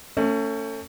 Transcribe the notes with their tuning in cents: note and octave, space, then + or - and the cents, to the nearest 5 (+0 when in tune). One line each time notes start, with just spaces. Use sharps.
A3 +30 C#4 +0